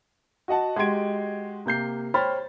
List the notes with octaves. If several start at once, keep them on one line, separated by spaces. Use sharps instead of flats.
F#4 D#5 F#5 A5
G#3 F#4 G4 C6 G#6 D7
C3 A#3 G6 C7
C5 C#5 G5 B5 F6 A6